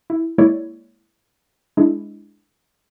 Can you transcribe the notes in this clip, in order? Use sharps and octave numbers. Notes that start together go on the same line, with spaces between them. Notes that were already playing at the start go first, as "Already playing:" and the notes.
E4
G#3 A#3 E4 C#5 D5
G#3 D4 E4